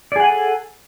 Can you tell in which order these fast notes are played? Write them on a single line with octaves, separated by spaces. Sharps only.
D5 G#4 F#5 G#5 A4